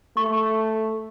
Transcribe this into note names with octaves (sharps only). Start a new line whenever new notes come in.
A3 C#6